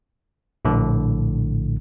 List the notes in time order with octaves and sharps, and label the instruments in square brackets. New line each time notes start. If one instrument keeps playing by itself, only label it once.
[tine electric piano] A#1 A2 D3